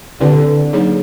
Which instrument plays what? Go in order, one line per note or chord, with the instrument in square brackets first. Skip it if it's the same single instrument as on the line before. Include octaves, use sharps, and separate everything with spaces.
[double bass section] D3 [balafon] C4 E4 G4 B4 D5
[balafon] F#3 A#3 D#4 G#4 C#5